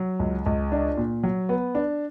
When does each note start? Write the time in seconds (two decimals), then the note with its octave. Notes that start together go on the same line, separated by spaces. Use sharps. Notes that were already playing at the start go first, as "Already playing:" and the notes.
Already playing: F#3
0.19 C#2
0.46 C#2
0.72 D4
0.97 A#2
1.23 F#3
1.49 B3
1.75 D4